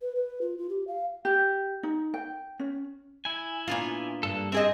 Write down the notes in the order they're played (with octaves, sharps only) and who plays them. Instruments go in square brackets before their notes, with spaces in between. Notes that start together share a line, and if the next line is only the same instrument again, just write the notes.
[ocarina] B4
B4
F4
F4
G4
F5
[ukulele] G4
D#4
G5
C#4
[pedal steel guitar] E4 G#5
[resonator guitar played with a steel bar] A#2 B3 F4 [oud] D4
[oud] G2 [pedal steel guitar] A#3 D4 A4
[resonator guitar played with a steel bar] C4 G#4 D#5 [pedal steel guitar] E5